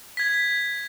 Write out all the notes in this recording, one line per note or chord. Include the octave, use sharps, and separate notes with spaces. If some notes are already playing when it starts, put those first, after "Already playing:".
G#6 B6